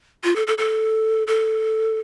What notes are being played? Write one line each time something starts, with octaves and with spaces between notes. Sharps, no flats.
F4
A4
A4
A4
A4